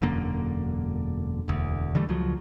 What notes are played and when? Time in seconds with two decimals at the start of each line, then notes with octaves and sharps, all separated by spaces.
0.02 E1 F#2 D3 A#3
1.48 E1 D2
1.95 D3 E3 G3 A3
2.09 C#2 F3 F#3